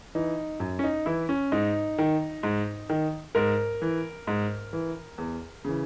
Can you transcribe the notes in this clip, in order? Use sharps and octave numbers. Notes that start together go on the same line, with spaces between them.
E3 D#4
F#2
C#4
D#4
E3 E4
C#4
G#2 D#4
D#3
G#2
D#3
G#2 A#4
E3
G#2
E3
E2
C#3 E3